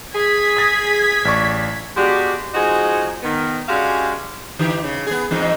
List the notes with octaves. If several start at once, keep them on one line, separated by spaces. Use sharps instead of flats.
G#4 G#6 B6
D#6 A6 A#6
A1 D5 C#6
G#3 B3 D4 F#4 G4
F3 G#3 D#4 F#4 G#4
D#3 B3
G#3 C#4 D4 F#4 G4 F5
D3 E3 G4
C#3
B3 G#4
E2 G#2 D#4